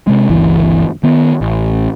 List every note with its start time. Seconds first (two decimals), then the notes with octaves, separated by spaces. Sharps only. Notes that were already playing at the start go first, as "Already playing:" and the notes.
0.07 C3 G#3
0.30 G1 C#2 E3
1.03 D#3 B3
1.41 A1